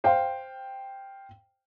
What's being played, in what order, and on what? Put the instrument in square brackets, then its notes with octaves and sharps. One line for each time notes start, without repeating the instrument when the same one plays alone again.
[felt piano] C5 F5 G5